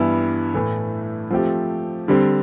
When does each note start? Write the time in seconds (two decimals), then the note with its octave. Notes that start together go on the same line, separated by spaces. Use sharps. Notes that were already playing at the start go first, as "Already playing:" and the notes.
Already playing: G2 E3 G3 B3 E4
0.54 A2 E3 A3
1.30 F3 A3 C4 G4
2.08 D3 G3 C4